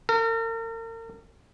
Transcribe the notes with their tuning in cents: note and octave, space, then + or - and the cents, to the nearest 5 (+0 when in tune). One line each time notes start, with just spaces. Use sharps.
A#4 -40